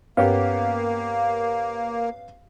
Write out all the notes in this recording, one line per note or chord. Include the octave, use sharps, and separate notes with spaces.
G2 A#3 B3 C#4 G4 F5